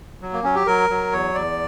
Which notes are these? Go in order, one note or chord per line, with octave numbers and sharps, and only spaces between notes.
F#3
A#3
F#3 C#4
G4
F#3 A#4
F#3
E2 C#5
E2 D5